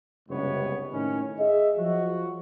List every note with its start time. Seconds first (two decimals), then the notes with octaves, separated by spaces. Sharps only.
0.29 F#1 C#2 G2 C3 B3 C#5
0.93 A2 D#3 A3 C#4
1.39 G#4 D#5 E5
1.78 F3 F#3 F#4